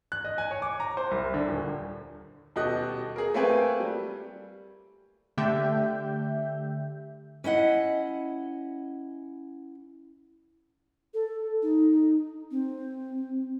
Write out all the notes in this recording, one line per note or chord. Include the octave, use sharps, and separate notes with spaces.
F#6
D#5
G#5
C#5
D6
A#5
C5
C2
D3
D#1
D#1 B2 G4 A4 D#5 F#6
G#4 A#4
A3 A#3 C4 B4 G5 G#5
G3
D3 A3 G4 E5 G5 G6
C#4 E4 D#5 F#5
A4
D#4
C4